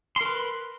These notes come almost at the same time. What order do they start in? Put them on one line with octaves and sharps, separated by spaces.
C6 A#4 B4